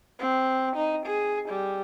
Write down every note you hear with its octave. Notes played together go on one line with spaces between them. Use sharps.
C4
D#4
G#4
G3